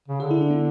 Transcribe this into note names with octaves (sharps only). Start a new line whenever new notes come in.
C#3
D3 G#4
E4
D4
B3